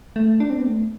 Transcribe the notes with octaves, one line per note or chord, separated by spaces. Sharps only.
A3
D4
C4
B3
A3